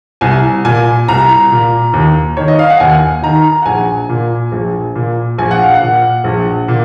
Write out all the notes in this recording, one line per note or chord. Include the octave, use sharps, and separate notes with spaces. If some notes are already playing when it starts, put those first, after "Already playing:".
C2 G#5
A#2 G#5
C2 A#5
A#2
D#2
D#3 C#5
D#5
F5
F#5
D#2 G#5
D#3 A#5
F#5
A#1 G#5
A#2
A#1
A#2
A#1 G#5
F#5
F5
F#5
A#2
A#1
A#2